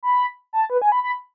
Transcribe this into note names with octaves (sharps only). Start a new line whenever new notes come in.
B5
A5
B4
G#5
B5
B5